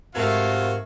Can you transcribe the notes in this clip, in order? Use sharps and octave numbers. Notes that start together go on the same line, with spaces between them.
G#2 C3 A3 F4 F#4 A#4 G#6